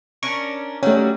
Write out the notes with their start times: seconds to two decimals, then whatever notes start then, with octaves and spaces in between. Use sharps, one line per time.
0.23 C#4 D4 A#4 C#6
0.83 D#3 F#3 G3 A3 C#4